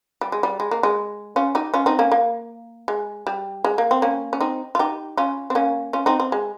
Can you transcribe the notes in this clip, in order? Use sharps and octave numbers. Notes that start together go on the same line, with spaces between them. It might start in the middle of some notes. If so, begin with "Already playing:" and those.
G3
G#3
G3
G#3
A#3
G#3
C#4 F4
D#4 G4
C#4 F4
C4 D#4
A#3 C#4
A#3
G#3
G3
G#3
A#3
C4
A#3 C#4
C#4
C4 D#4
F4
D#4 G4
C#4 F4
C4
A#3 C#4
C#4 F4
C4 D#4
C4
G#3